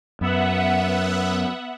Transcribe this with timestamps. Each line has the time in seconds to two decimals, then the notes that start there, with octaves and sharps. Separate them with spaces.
0.21 F#2 B3 E5 F#5